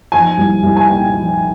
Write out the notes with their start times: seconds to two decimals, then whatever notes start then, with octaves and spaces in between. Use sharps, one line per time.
0.12 F3 G#5
0.37 C2
0.63 C2
0.77 G#5
0.89 A#2 G5
1.14 F3